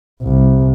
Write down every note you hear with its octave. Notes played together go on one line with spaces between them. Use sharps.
C2